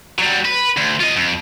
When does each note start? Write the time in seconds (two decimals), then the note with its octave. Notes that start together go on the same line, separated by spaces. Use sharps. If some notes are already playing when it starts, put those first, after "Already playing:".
0.19 F#3 G3
0.45 B4
0.77 D2
1.00 F4 D#5
1.16 F2